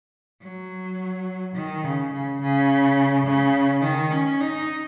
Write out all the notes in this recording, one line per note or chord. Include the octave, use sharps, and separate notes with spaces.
F#3
D#3
C#3
C#3
C#3
C#3
D#3
C#4
D#4